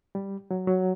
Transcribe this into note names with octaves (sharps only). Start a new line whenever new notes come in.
G3
F#3
F#3